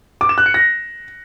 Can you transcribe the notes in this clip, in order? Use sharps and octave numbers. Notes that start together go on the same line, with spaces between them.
D6
E7
F#6
C#7
A#6